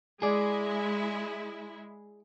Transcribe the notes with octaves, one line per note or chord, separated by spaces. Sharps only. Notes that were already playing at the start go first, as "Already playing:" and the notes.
G#3 E4 G#4 D5